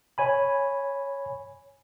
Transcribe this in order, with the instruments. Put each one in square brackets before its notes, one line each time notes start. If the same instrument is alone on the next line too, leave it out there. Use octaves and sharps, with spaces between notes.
[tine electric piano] C#5 G#5 B5